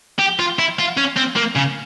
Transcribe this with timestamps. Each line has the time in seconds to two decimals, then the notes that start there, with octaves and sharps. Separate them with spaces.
0.19 G4
0.39 F4
0.59 E4
0.79 F4
0.98 C#4
1.17 C4
1.36 A#3
1.56 C#3